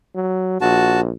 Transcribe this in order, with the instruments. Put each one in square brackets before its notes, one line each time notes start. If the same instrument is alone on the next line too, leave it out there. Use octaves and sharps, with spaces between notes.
[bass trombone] F#3
[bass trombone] A#1 [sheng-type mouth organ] F#4 A5